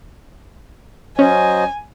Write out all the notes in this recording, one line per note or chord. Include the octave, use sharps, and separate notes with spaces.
F#3 C#4 C5 D#5 G#5